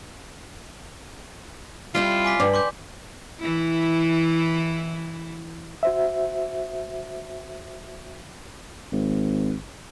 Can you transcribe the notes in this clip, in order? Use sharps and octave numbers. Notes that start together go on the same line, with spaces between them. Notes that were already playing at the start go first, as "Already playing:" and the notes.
G3 C4 E4 F4
G#5 D6 B6
G2 D5 G5
C6 D6 G6
E3 E4
F#4 C5 E5
G#1